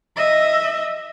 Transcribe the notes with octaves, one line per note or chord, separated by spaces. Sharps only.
D#5 E5